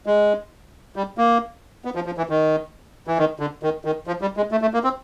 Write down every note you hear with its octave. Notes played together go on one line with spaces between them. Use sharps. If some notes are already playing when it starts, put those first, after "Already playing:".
G#3
G3
A#3
B3
F3
F3
E3
D#3
E3
D#3
D3
D#3
D#3
F3
G3
G#3
A3
A3
A#3
C4